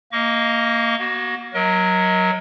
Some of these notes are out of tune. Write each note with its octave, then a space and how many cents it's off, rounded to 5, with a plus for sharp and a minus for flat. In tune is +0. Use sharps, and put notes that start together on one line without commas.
A#3 -10 D#5 +10 C#6 +40
B3 -45 F#4 +15
F#3 +0 A#4 +20 D#5 +30